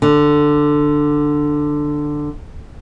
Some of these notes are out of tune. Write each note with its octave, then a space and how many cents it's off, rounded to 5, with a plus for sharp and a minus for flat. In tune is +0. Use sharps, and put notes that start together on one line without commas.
D3 +10